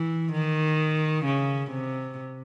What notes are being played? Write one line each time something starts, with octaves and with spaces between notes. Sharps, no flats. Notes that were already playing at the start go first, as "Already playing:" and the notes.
Already playing: E3
D#3
C#3
C3